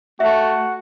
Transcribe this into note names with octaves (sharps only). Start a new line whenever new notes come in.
A3 F#4 E5